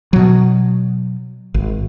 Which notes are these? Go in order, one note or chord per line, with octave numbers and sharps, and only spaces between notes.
B2 F#3
G#1